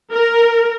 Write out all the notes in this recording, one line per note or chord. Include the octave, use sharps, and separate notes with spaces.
A#4